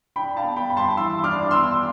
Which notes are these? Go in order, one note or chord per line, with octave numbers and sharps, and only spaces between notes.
D4 G5 B5
F5 A5
B3
G5 B5
G2 B5
A5 C6
E3 C6 E6
D4 D6 F6
B3 C6 E6